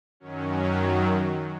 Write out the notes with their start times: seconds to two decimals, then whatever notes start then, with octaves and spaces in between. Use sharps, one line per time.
0.20 F#2 D#3 F#3 C#4
0.51 C#4